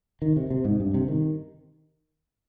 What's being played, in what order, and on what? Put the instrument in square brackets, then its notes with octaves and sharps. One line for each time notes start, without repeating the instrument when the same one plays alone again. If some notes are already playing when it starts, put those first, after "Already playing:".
[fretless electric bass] D#3
C3
C3
G#2
G2
C3
D#3